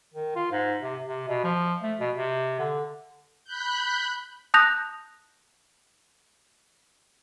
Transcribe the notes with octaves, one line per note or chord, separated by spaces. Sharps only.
D#3
F4
G#2
C3
C3
B2
F3
A3
B2
C3
D3
B5 F#6 G6
A5 D#6 F#6 G6 A#6 F7